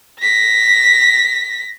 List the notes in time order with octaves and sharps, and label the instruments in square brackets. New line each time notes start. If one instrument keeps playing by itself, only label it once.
[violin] A#6 B6